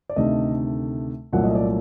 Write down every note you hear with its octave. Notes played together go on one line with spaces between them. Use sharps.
D5
D2 C3 D#3 A3 D#5
C2 A#2 F#3 A3 F#5
D#5
D5